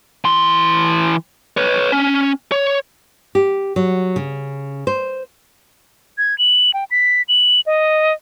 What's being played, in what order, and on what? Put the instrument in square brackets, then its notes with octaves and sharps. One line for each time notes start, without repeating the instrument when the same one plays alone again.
[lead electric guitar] E3 C6
B4 C#5
C#4
C#5
[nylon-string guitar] G4
F#3
C#3
C5
[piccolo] G#6
F#7
G5
B6
F#7
D#5